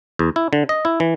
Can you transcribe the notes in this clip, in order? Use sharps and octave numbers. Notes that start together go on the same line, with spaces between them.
E2
E4
D3
D#5
E4
E3